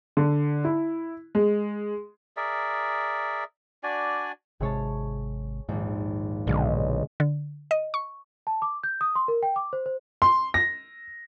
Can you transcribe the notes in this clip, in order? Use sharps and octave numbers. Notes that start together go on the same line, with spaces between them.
D3
E4
G#3
G#4 A#4 D5 E5
D4 F#4 D5 G#5
G#1 C3 G#3 G#4 C#5 A5
A#1 D#2 G#2
B1 A#2 D3 G#3
D3
D#5
C#6
A5
D6
G6
D#6
C6
A#4
G5
D6
C5
C5
C6
A#6